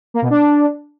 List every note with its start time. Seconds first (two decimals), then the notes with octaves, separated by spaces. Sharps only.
0.14 A#3
0.22 B2
0.30 D4